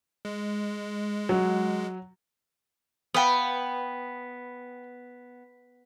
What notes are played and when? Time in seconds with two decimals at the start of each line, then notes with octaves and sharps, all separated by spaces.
0.25 G#3
1.29 F#3
3.14 B3 B4 F5 G5 B5 D#6